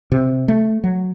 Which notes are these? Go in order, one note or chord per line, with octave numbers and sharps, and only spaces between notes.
C3
A3
F#3